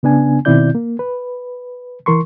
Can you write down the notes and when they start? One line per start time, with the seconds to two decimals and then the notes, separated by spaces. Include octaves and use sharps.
0.03 C#3 B3 D4 G#5
0.45 B2 D#3 C4 E4 D5 G6
0.75 A#3
0.99 B4
2.06 E3 A#4 C6 C#6